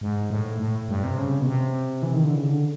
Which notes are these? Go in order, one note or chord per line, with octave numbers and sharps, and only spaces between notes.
G#2
A2
A2
G2
C3
C#3
B2
C3
E3
D#3
D3
C#3
D3